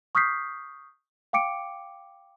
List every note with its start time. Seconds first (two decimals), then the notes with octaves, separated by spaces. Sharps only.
0.15 C#6 D#6 F6 G6 B6 C7
1.33 F5 G5 D6 C#7 D7